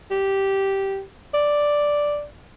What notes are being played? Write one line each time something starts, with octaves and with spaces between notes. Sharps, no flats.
G4
D5